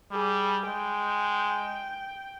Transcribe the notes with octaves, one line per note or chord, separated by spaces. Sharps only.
G3 G#4
G#3 G5